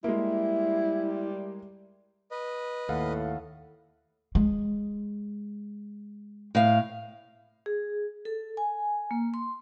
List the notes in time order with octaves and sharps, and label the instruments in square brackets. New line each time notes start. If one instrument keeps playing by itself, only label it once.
[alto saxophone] G3 [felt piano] G#3 A#3 [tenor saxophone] E4
[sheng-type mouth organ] B4 D#5
[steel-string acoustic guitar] D#2 [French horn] A2 [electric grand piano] A4 F5 F#5
[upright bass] G#3
[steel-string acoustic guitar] A2 F5
[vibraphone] G#4
A4
G#5
A#3
C6